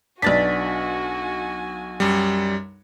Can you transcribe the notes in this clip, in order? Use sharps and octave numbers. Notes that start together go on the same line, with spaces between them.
B1 D4 F#4 B4 G#5 A6 B6
F#2 G3